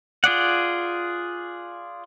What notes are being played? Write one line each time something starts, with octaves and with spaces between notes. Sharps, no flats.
F4 G#4 D5 F#5